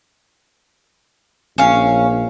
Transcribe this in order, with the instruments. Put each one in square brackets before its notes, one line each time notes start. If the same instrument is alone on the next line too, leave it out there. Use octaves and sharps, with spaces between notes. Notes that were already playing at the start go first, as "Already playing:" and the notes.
[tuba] A#1 [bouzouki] C#4 F5